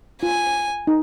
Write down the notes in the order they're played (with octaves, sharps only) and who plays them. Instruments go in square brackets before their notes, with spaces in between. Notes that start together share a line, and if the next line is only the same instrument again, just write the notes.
[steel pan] F4 [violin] G#5
[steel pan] D#4